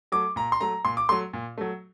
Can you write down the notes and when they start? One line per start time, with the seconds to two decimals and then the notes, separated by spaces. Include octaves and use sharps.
0.12 F#3 A3 D6
0.36 A#2 A#5
0.52 C6
0.61 F#3 A3 A#5
0.85 A#2 C6
0.97 D6
1.09 F#3 A3 C6
1.33 A#2
1.58 F#3 A3